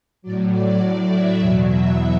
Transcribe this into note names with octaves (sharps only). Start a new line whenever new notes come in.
A2 F#3 D5
D5
D5
E5
E2 B2 F#3
E5